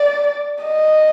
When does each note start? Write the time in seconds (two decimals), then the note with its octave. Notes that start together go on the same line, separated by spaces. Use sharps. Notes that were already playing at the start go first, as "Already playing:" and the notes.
Already playing: D5
0.64 D#5